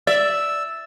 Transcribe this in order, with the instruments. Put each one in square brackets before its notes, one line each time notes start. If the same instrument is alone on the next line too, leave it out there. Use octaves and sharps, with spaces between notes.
[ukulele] D5 [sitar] E5 [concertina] E6 [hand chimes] A6